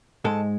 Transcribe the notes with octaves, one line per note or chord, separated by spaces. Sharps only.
G#2 G#3 A4